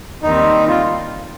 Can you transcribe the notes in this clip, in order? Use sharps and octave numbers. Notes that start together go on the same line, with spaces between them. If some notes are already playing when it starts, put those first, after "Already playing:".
D#2 D#3 G3 C4 D#4
F4